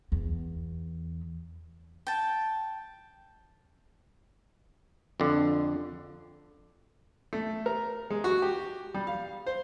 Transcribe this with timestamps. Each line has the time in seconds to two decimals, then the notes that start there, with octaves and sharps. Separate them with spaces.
0.12 E2
2.07 G5 A5
5.20 F2 D3
7.33 A3
7.66 A#4
8.10 G#3
8.24 F#4
8.42 G4
8.94 G3
9.07 F5
9.46 C5